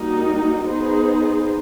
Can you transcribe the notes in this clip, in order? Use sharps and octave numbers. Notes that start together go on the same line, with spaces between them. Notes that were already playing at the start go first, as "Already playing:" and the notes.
Already playing: G3 A#3 D#4 F#4
B3 D#4 G#4 C5